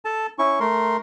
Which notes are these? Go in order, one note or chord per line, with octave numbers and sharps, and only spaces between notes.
A4 A5
C#4 E4 C#6
A3 A#4 C6